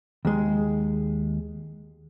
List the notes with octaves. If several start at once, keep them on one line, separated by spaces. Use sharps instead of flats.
D#2 G#3